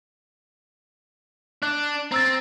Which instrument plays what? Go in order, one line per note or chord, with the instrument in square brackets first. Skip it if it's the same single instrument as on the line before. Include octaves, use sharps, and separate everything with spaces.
[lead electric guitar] D4 [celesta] F#6
[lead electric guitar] C4 [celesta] A#5 E6 A6